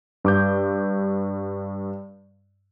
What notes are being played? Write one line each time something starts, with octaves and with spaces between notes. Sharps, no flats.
G2 D6 G6